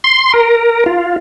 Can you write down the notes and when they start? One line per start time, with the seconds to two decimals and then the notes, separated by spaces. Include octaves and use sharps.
0.04 C6
0.34 A#4
0.86 F4